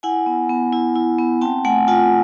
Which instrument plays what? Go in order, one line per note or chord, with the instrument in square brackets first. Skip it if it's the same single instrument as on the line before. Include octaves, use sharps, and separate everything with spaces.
[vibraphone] E4 F#5 G#5
B3
B3
E4
E4
B3
C4 G5 A5
A3 F#5 G#5
F4 F#5 G#5